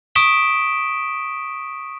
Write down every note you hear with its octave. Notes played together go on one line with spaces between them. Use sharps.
C#6 D#6 B6 D7 E7 G7